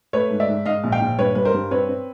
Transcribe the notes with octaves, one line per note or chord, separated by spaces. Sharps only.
A3 B4 C#5
G#2
D5 E5
G#2
G#2 D#5 F5
A#1
F5 G5
A#1
G2 B4 C#5
G3 B4
A#4 C5
G2
C4 B4 C#5
C4